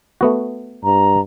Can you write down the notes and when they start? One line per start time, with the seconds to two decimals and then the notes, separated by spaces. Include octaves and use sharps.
0.21 A3 B3 F#4
0.84 G2 A#5